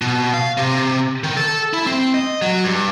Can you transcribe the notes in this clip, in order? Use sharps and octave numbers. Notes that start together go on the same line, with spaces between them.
B2
F5
C3
D#3
A4
E4
C4
D#5
F#3
G2